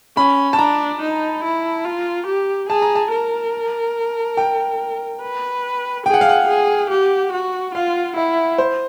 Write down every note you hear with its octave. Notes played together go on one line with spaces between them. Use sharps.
C#4 B5
A5
D4 A#5
D#4
E4
F4
G4
G#4 A5
A#5
A5
A#4
G5
B4
G#4 G5
F#5
F5
F#5
G#4
G4
F#4
F4 F5
E4 E5
C5